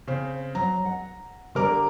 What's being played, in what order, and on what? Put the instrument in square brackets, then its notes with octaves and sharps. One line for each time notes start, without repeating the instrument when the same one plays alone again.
[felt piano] C#3 C4
[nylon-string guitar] F#3 [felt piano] A#5
[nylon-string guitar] F#5
[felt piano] D3 A#4 D6 [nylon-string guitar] G3